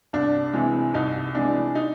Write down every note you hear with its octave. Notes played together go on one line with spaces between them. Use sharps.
C2 D4
C3 E3 G#3
C2 D#4
C3 E3 G#3 D4
D#4